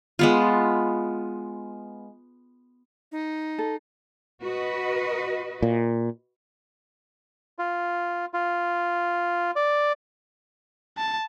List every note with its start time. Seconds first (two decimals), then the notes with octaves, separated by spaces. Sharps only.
0.19 G#3 B3 F4
3.12 D#4
3.58 A4
4.45 F#4 B4 D#5
5.62 A#2
7.59 F4
8.34 F4
9.56 D5
10.98 A5